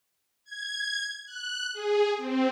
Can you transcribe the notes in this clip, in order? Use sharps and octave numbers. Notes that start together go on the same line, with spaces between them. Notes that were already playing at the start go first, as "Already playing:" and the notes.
G#6
F#6
G#4
C4